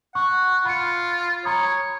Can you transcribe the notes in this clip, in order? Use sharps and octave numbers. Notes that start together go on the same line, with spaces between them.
F#5 C#6
F4 B5 C#7
C#5 A#5 B5 D#6